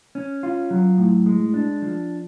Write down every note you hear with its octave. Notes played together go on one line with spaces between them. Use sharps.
C#4
F4
F#3
A2
G#3
D4
F3